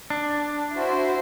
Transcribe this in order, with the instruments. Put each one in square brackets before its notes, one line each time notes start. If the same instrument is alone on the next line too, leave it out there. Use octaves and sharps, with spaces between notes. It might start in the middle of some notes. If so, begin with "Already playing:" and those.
[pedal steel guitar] D4
[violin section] E4 C5 [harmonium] F#4